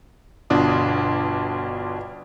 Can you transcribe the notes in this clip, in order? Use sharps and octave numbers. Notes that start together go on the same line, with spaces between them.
G1 B2 D4 F4 D#6